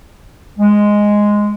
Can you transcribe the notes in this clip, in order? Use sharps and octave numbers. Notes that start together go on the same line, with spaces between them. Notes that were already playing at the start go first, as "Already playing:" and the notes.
G#3